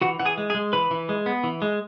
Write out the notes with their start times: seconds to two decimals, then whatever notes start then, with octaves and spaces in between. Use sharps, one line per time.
0.01 E3 F#4 F#5
0.20 E3 F#5
0.25 G#4 G#5
0.38 G#3
0.50 G#4 G#5
0.55 G#3
0.73 E3 B4 B5
0.91 E3
1.09 G#3
1.26 B3
1.44 E3
1.62 G#3